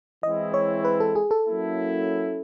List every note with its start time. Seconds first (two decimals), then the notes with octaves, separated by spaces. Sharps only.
0.23 E3 G#3 C4 E4 D#5
0.54 C#5
0.85 B4
1.00 A4
1.15 G#4
1.31 A4
1.47 F#3 A#3 C#4 E4